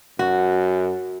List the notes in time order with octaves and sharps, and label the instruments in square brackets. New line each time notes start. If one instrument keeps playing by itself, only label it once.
[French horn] F#2 [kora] F#4